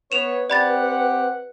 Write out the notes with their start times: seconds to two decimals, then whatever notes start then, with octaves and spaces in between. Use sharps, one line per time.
0.12 B3 B4 C#5 E7 F7
0.50 C4 G4 D5 F#5 B5 A6